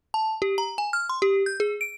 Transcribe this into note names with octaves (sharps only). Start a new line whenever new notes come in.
A5
G4
A#5
G#5
F6
C6
G4
G6
G#4
D7